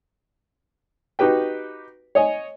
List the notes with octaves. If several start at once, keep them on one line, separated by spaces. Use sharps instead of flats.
D#4 F#4 G4 B4 G5
C#5 D#5 G#5